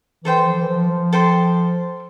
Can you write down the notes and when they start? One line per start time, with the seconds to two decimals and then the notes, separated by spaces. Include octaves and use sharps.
0.25 E3 A4 C5 G5 C6
0.47 F3
0.61 E3
0.69 F3
0.91 F3
1.13 A4 C5 G5 C6